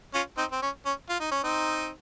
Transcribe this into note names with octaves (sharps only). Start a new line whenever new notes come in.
C#4 F4
C4 D#4
C4
C#4
C#4
F4
D#4
C#4
C4 D#4